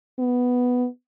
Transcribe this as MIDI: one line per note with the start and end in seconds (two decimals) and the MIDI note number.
0.19 0.87 59